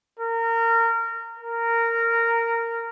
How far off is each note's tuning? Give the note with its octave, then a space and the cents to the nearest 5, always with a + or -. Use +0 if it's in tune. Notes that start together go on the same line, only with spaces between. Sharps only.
A#4 -25
A#4 -15